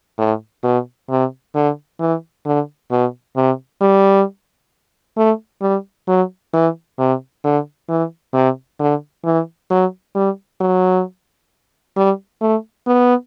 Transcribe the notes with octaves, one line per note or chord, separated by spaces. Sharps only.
A2
B2
C3
D3
E3
D3
B2
C3
G3
A3
G3
F#3
E3
C3
D3
E3
C3
D3
E3
F#3
G3
F#3
G3
A3
B3